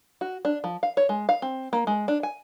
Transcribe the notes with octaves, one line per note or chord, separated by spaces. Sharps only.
F#4
D4
F3
F5
C#5
G#3
F5
C4
A#3
G#3
D4
G#5